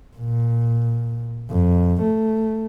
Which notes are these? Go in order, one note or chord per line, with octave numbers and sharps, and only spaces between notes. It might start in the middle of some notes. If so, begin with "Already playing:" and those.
A#2
F2
A3